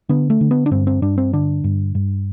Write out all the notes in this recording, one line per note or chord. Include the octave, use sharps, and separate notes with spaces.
D3 B3
A3
D3
B3
D4
G2 C4
C4
G2 D4
C4
D3 D4
G2
G2